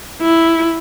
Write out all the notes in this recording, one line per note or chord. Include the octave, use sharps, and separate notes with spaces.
E4